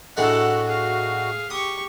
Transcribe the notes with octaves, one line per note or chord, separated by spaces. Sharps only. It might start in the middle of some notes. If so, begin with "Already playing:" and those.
A2 G#3 D4 F#4 A4 F#5
G#4 F5
G4 C#6 D#6